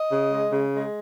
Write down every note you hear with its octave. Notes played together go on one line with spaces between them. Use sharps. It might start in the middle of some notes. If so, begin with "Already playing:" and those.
Already playing: D#5
C#3
G#3
C#3
G#3